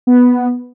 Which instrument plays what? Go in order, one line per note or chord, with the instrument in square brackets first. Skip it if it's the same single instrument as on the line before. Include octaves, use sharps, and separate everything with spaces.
[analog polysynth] B3